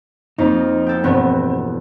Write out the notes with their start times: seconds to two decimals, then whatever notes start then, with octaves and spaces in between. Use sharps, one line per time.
0.38 F2 A#3 C4 D#4
0.87 A4 G5
1.04 E1 G2 B3 C4